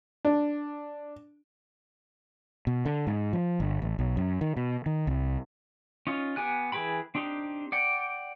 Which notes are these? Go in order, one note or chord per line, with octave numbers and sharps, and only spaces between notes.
D4
B2
D3
G#2
F3
G1
A1
B1
F#2
D#3
B2
D#3
C2
C#4 D#4 F4
B3 G4 G#5 F#6
E3 G#4 B4 G5 B5
C4 D4 D#4 G4
D5 F#5 G5